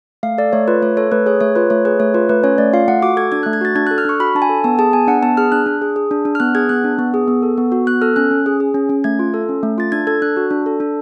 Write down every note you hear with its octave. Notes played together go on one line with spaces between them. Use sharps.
A3 F5
A4 D5
A3 C#5
F4 B4
A3 C#5
A4 C#5
A3 B4
G#4 C#5
A3 C#5
F4 B4
A3 C#5
G#4 B4
A3 C#5
F4 B4
A3 B4
C#4 C#5
A3 D5
F4 F5
A3 F#5
F#4 D6
A4 G#6
D4 G#6
F#6
A3
G#6
F#4 A6
D4 G#6
F#6
A4
F6
D4 C#6
F#4 B5
D4 A5
G#5
A4
B3 A5
G#4 A5
B3 G#5
D4 F#5
B3 A5
G#4 F6
D4 F#6
D4
G#4
G#4
D4
D4
F6
B3 F#6
G#4 G#6
B3 F#6
D4
B3
G#4
B3
A4
B3
F#4
B3 F#6
A4 F6
C#4 F#6
C#4
G#4
G#4
C#4
C#4
A3 G#6
F4
A4
C#4
A3
F4 A6
D4 G#6
A4 G#6
D4 F#6
F#4
D4
A4
D4